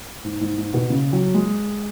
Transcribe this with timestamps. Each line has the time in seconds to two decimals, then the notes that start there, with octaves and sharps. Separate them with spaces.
0.24 G#2
0.41 G#2
0.58 G#2
0.74 B2
0.90 C#3
1.13 F#3
1.34 G#3